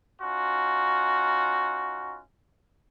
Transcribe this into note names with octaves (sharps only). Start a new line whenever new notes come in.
C#4 D#4 F4 F#4